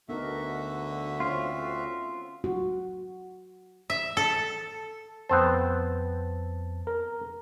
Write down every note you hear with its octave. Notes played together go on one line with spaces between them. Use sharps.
D2 D3 B3 D#4 F#4 A#4 E5
C4 C#4 F4 C#5
F#4
E5
A4
F2 B3 C4 C5 A5
A#4